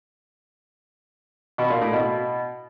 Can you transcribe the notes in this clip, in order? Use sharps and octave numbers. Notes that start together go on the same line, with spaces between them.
B2
A#2
A2
B2